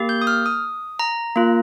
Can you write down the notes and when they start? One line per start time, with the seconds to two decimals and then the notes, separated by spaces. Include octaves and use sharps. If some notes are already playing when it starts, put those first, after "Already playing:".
Already playing: A#3 G4
0.09 G6
0.21 D#6
0.27 F6
0.46 D#6
0.99 A#5
1.36 A#3 F4